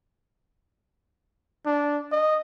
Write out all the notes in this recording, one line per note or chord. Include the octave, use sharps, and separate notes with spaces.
D4
D#5